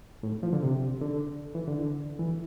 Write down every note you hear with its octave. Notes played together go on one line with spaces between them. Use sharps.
A2
F3
D3
C3
D3
E3
D3
E3